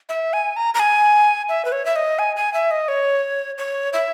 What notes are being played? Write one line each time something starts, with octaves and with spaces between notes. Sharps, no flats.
E5
G#5
A#5
A#5
G#5
E5
B4
C#5
E5
D#5
G#5
G#5
E5
D#5
C#5
C#5
E5